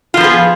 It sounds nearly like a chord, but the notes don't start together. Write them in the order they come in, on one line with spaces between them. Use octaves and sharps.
F4 F3 B3 G#4